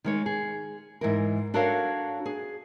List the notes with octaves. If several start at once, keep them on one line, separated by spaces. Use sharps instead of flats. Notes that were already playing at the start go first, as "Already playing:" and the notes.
D#3 G#3 C#5
G#4
G#2 E3 A#4
D4 F#4 A4 A#4 C#5 F5
G#4